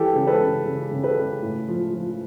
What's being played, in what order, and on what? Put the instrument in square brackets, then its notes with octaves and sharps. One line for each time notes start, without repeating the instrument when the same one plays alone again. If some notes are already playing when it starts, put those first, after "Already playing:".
Already playing: [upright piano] E3 G4 A4
C#3
A4 B4
C#3
C#3
C#3
A4 B4
C#3
A2
F3
F3